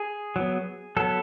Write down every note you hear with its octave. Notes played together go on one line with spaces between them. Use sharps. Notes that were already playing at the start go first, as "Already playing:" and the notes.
Already playing: G#4
F#3 B3
F#3 B3 A4